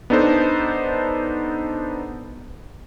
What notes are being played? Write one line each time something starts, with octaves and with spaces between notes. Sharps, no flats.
B3 D4 D#4 A4 C5